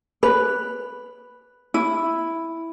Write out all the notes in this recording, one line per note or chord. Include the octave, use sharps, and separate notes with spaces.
B4
E4